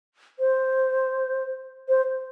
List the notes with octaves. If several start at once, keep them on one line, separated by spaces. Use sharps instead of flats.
C5
C5